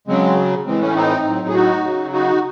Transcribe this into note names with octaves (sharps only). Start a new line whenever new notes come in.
C#3 F#3 G#3 C4
A2 E3 G#3 C4
A3 C#4
C4 D#4
A2 F#3
G#4
D#4 F#4
C#3 F#3
D#4 F#4